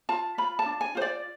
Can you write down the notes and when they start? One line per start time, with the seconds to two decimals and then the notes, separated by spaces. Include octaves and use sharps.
0.09 F4 A5
0.38 F4 B5
0.59 A5
0.66 D4
0.81 G#5
0.95 F4 C5
1.02 D5